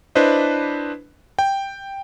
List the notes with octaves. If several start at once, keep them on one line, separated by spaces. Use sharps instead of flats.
D4 E4 B4 C5 D#5
G5